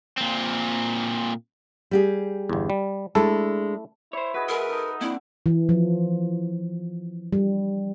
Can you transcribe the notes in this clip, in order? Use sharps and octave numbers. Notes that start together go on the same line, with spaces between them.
A#2 C4
G3 G4 G#4
G1 E2
G3
G#3 A3 D4 E4 A4
E4 C5 C#5
F#4 G#4 B4 D#5
G#3 G#4 A#4 E5
D#4 A4
A#3 C4 D4 E4
E3
F3
G3